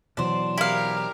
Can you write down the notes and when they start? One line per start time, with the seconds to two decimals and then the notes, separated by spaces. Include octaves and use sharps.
0.17 B2 E3 F#3 D4 C5
0.58 E4 G4 A#4 F5